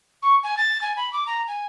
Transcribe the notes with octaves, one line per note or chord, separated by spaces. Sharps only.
C#6
G#5
A6
G#5
B5
D6
A#5
G#5